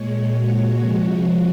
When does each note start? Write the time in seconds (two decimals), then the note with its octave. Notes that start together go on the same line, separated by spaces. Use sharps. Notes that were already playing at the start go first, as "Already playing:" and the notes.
Already playing: A#2 G#3 C#5
0.34 F#4
0.80 C3 F3 G#3